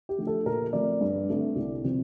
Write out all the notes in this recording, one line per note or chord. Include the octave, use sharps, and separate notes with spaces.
G4
D3 F3 A3
A4
A#2 A#4
F3 A3 C4 D5
G2
D3 A3 C4
C2
C3 F3 C4